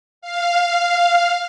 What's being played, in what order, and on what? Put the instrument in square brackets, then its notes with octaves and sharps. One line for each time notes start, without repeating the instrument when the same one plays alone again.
[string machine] F5